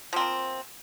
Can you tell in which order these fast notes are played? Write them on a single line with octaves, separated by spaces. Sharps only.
F3 C4 A#3